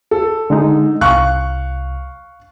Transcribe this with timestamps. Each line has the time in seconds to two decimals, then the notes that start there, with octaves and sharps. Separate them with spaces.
0.11 A4
0.50 D3 G#3 D#4
1.01 C2 F5 C#6 F#6